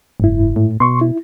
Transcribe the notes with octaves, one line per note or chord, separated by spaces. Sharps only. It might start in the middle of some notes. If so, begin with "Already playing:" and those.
F#1 G#2 E4
A2
B2 C6 C#6
E4